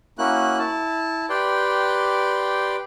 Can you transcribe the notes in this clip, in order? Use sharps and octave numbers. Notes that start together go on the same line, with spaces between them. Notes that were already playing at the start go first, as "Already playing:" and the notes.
A#3 C#4 E4 F#4 F#6
E4 A5
G4 B4 D5 G5 C6